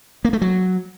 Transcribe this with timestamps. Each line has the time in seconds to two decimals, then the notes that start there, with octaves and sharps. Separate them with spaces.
0.25 A#3
0.33 A3
0.42 F#3